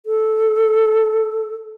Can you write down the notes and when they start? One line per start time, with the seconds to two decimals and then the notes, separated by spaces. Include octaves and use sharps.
0.06 A4